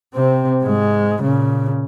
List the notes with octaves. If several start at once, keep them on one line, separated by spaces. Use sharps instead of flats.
C3 C4
G#2 G#3
A#2 C#3